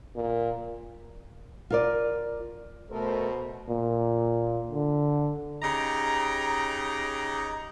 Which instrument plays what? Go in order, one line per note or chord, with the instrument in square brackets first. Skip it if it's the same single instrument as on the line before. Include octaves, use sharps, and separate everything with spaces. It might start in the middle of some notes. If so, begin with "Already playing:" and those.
[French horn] A#2
[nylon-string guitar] F4 A#4 D5
[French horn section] B2 C5 [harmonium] A3 A4 A#4
[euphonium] A#2
D3
[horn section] C#3 D#4 G4 A#5